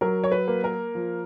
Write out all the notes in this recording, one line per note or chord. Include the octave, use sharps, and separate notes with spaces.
F#3 A#4
C#5
B4
A#3
A#4
F3